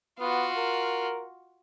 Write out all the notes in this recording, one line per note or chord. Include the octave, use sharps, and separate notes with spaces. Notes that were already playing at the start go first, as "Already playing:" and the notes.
B3 F4 F#4
A#4